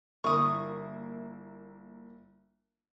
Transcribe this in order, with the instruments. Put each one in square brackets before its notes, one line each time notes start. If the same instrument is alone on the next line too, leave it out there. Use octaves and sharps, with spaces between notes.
[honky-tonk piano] G1 A#3 E4 [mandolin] C#6 D#6